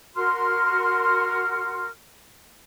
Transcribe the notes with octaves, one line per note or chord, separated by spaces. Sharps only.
F#4 A#4 C6 F6